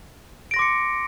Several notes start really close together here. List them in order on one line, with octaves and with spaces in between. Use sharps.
D7 A#6 C6 D6 C#7